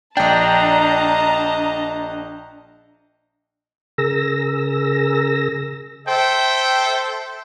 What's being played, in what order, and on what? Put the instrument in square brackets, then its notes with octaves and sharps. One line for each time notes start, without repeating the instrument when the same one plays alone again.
[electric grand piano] A#1 G5 [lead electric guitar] D4 [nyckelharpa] D#5 [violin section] A5 A#5
[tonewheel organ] C#3 G#4 A#4 E6 A#6
[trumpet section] A4 C5 E5 G5